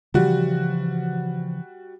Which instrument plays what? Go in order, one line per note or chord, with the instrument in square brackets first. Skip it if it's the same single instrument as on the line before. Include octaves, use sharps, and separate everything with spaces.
[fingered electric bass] C#3 E3 F3 [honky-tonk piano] G3 F#4